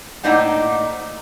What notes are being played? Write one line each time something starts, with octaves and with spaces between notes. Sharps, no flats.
A2 A#3 D4 D#4 C5 F#5